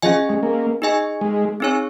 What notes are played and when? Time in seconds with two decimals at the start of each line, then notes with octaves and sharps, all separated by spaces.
0.02 F3 C#4 G#4 D#5 G#5
0.29 G#3
0.43 A#3
0.82 D#4 G#4 D#5 G#5
1.21 G#3
1.60 C4 D#4 G#4 C#5 G#5